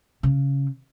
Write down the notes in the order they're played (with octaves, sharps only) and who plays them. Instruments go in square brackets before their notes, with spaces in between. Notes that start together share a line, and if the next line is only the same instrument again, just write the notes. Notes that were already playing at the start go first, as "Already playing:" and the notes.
[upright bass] C#3